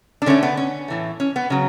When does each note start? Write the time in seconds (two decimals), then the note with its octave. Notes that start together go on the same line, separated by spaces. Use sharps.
0.22 D4
0.26 D3 A3 C#4
0.43 B3
0.57 C#4
0.88 A2 E3 A3
1.20 C#4
1.36 B3
1.50 C#3 F#3 C#4